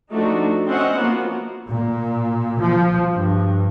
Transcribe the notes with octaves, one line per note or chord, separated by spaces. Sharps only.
F3 A3 D4 D#4 F#4
C4 C#4 C5 D#5 E5 F#5
F3 A#3 B3 D#4 F#4
A#2
F3
G2